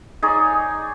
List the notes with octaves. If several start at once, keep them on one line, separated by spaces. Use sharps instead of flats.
D#4 G#4 C#5 D5